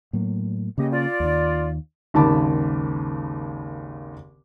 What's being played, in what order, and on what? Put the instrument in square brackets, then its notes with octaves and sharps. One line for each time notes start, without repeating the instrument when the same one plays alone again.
[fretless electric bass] A2 F#3 A#3
[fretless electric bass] C#3 A#3 [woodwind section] G4 D#5
[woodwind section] F4 D5
[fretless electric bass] D#2 D#3
[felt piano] G#1 D#2 C#3 A5 B5 D6